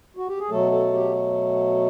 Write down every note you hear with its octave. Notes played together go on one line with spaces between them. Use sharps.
F#4
G4
G#4
B2 F#3 A3 A4
A4
G4